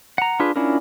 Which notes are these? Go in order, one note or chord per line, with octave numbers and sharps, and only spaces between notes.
F#5 A#5
D4 F4 G#4 B4
C#4 D4 E4 F4 A#4